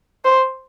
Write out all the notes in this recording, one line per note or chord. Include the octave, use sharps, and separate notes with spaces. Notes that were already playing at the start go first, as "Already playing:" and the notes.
C5